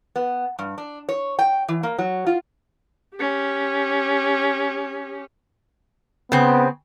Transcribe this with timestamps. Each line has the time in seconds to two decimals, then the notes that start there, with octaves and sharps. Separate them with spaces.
0.16 B3
0.59 G2
0.78 D4
1.09 C#5
1.39 G5
1.68 E3
1.83 A#3
1.98 F#3
2.26 F4
3.16 C#4 G4
6.32 C#3 B3 C4